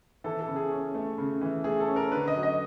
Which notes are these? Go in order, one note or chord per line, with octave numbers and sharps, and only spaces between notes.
E3 A4
A4
C#3
G#4
C#4
A3
C#3
E3
A3 G#4
A4
C#4
A#4
D3 B4
D#5
F#3
D#5